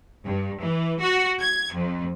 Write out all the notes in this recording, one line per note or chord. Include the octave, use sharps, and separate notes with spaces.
G2
E3
F#4
G#6
F2